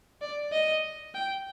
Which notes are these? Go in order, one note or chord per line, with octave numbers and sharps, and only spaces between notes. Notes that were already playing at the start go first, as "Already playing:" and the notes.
D5
D#5
G5